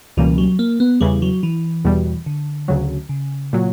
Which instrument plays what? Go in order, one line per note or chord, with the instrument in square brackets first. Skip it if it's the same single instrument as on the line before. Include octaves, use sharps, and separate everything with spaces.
[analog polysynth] C#2 B2 G3 A#3 C#4 [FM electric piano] E3
[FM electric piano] F#3
A#3
B3
[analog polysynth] E2 C#3 E3 [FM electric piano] G3
[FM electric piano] F#3
E3
[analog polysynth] E2 B2 G3
[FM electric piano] D3
[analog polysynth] D2 C#3 F#3
[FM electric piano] C#3
[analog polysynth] A#2 F#3